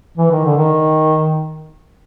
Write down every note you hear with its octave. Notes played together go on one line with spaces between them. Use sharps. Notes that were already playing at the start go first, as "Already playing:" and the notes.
E3
D#3
D3
D#3